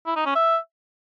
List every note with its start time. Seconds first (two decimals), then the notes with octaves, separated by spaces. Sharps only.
0.06 E4
0.16 D#4
0.26 C#4
0.35 E5